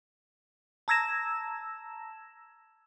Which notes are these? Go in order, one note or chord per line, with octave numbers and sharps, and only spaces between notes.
A5 A#5 E6 G#6 A#6 E7